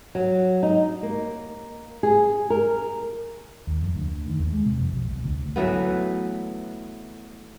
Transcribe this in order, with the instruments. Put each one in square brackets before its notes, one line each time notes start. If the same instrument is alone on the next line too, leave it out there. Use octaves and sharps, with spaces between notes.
[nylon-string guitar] F#3
D#4
A#3
G#4
A#4
[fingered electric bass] D#2
F2
D2
D#3
D#2
G#3
C3
F2
B1
C2
D2
[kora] E3 F#3 A3 B3